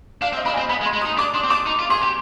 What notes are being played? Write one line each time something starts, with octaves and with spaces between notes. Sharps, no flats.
D4 F5
C4
D#5
D4 B5
C4 G#5
B3 B5
G#3
C6
G#3
D#4 D#6
D4 D6
D4 C6
C4
D4 D6
D#4
F4
G#4 C6
G4